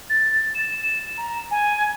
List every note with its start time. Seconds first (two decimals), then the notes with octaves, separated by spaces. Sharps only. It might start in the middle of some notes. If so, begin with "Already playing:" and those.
0.09 A6
0.54 E7
1.17 A#5
1.51 G#5